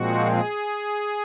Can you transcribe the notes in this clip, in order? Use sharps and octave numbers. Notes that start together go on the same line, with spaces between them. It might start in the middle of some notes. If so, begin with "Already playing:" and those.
Already playing: A#2 F3 G#3 C4 F#4
G#4